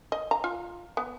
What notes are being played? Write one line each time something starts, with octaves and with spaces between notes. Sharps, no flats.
D#5
A#5
F4
B3